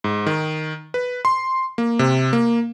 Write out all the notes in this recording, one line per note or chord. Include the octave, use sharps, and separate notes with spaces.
G#2
D#3
B4
C6
A#3
C3
A#3